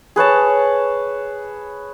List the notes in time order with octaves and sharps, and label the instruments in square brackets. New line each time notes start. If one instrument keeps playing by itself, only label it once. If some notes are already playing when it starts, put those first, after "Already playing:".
[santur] G#4 B4 C#5 A5